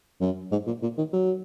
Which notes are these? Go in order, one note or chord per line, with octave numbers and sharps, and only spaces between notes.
F#2
G#2
A#2
A#2
D#3
F#3